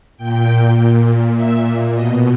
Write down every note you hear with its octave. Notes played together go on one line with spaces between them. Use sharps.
A#2 G5
A#2
A#2 E5
B2 D#5